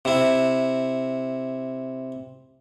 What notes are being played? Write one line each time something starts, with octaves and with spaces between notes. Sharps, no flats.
C3 E4